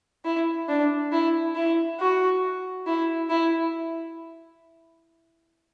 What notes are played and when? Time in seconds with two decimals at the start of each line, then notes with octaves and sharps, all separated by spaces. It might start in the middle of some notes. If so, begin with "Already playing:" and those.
0.25 E4
0.68 D4
1.12 E4
1.55 E4
1.99 F#4
2.87 E4
3.30 E4